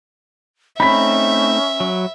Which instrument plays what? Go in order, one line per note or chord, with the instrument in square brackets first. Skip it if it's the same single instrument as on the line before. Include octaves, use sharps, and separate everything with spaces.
[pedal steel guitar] A3 C4 D#4 [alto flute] C#4 [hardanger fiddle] E5 [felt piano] B5 B6
[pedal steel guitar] F#3